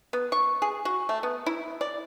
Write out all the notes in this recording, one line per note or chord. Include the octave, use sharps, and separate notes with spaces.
B3
C#6
G#4
F#4
A3
B3
E4
D5